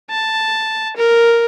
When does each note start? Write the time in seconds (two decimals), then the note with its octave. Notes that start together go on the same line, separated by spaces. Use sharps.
0.10 A5
0.97 A#4